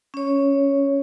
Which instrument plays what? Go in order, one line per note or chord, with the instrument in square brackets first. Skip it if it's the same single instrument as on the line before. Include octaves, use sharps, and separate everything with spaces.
[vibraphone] C#4 C#5